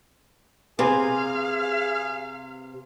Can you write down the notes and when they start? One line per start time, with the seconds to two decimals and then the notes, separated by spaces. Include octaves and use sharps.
0.79 C3 G#4 B4 C5 F5 G#5